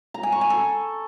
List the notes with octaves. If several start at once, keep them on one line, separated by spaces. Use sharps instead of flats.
A#5
G#5
C#6
G#5
A4